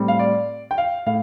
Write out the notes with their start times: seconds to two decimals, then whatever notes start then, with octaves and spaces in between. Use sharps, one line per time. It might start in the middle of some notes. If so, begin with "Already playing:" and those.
Already playing: A2 G3 C4
0.08 F5
0.19 D5
0.71 G5
0.78 F5
1.06 A2 F5